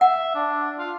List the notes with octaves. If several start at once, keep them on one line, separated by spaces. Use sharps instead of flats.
E5 F#5
D4
F4